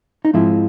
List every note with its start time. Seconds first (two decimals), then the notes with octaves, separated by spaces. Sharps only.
0.25 D#4
0.33 G#2 F3 G#3 C4 E4